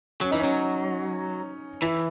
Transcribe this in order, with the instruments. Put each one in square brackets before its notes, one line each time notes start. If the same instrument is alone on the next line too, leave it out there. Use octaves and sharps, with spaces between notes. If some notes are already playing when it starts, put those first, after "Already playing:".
[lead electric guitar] F#3 [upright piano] C#4
[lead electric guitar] E3 [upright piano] D#4
[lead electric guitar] F#3 [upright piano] C#4
[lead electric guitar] E3 [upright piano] E4